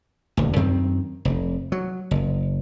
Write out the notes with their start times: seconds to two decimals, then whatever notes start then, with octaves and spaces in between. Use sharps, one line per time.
0.37 D#1 D2
0.56 F#2 D#3 C4
1.25 F1
1.72 F#3
2.11 F#1